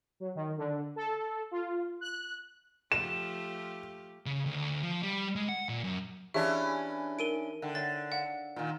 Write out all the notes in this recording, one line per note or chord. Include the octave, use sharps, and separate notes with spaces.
F#3
D#3
D3
A4
F4
F#6
F3 A3 G4 E7
C#3
D2
F3
G3
G#3
F#5
A#2
F#2
E3 C#4 D4 G4 G#4 E5 F5
D#4 A#4 D7 D#7 G7
D3 E5 G5
C#5 E5 F#5 A6
C5 F5 F#5
A#2 D#3